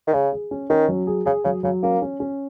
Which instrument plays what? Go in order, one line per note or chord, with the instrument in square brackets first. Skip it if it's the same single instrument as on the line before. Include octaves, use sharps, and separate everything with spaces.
[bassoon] D#3
[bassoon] C#3 [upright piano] G#4
[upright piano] G#4
C#4
[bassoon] D#3 [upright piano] C#4
[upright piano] F#3
G#4
[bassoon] C#3 [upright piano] G#4
[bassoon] C#3 [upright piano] F#3
[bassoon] C#3 [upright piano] F#3
[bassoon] A#3 [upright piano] C#4
[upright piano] C#4
C#4